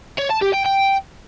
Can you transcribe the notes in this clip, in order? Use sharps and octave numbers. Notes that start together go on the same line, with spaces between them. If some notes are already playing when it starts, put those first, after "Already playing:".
C#5
A5
G4
G5
G5